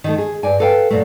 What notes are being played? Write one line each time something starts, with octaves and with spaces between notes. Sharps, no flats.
D#3 E3 A3
G#4
G2 D5 G#5
A4 B4 F5 G5
F#2 A#2 A3